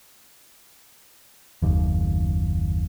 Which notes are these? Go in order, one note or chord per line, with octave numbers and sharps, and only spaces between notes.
F#1 D#2